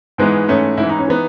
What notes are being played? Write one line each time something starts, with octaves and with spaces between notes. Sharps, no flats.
G#2 E3 G#3 B3
G#2 E3 A3 C#4
G#2 E4
E3
D#4
C#4
E3 B3 D#4